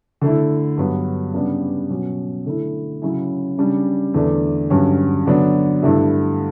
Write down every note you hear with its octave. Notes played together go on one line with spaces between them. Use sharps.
D3 A3 E4
G2 F#3 B3
C#3 G3 B3 D4
B2 F#3 C#4
D3 A3 E4
C#3 F#3 C#4 E4
C#3 G3 D4
E2 D3 A3 D4
G2 D3 F#3 C#4
D3 F#3 B3 D4
G2 D3 A3 E4